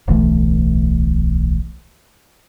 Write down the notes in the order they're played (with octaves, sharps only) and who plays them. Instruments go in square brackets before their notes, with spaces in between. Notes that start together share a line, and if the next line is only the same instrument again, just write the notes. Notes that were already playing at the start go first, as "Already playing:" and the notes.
[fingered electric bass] D1 B1 E3 A3